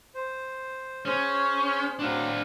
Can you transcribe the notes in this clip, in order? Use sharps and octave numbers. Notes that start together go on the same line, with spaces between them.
C5
C#4 G#4 C5 C#5
F#3 C4 D4 F5